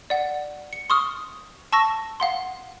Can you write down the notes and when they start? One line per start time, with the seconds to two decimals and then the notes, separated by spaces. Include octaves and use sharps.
0.10 D5 F#5
0.73 C#7
0.90 C6 C#6 D#6 F6
1.72 A5 C#6 E6 A#6
2.20 F5 F#5 C6